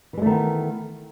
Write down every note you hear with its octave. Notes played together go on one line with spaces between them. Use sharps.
D#3 E3 G#3 A3 B3